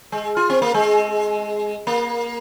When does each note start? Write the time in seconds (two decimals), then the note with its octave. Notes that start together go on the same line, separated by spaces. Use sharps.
0.12 G#3
0.37 F4
0.50 C4
0.62 A#3
0.74 G#3
1.87 A#3